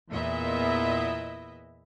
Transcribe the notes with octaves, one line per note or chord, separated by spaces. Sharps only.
E2 A#2 B3 E4 D#5 E5